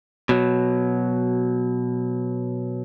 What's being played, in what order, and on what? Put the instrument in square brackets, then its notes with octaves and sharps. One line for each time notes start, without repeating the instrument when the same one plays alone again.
[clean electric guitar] B2 F#3